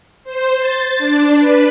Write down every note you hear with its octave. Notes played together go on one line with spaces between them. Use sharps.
C5
A6
D4
B4